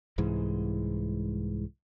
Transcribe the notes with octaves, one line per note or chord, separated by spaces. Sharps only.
C2 G#2 E3 G#3